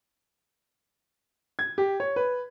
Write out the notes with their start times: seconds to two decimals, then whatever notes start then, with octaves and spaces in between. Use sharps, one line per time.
1.59 G#6
1.78 G4
2.00 C#5
2.16 B4